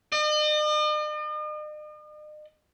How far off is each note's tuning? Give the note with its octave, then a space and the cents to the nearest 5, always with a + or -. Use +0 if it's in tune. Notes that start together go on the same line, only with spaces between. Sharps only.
D#5 -45